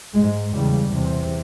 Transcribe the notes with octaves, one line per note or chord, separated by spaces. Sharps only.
G#2 G#3
E2 C#3 G3
E2 C3